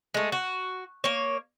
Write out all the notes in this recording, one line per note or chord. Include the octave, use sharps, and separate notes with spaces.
G#3 A3
F#4
A#3 C#5